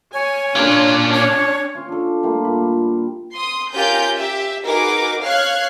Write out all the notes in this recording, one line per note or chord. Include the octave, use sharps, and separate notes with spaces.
C#5 G#5
A#2 C#4 D4 F4
C#5
C#4 F4
D4 A4
G3 A3 A#3 F4
A#2 B5
C6 D#6
C#4 F4 G4 A#4 G#5 G6
G4 E5
D#4 F#4 G#4 A#4 B4 D6
C#5 F5 F6 F#6 G#6 C7